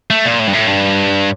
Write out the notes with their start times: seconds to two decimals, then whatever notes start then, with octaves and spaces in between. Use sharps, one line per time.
0.10 A3
0.25 A#2
0.40 A2
0.48 G2
0.54 A2
0.68 G2